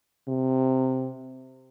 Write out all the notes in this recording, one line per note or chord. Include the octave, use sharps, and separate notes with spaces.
C3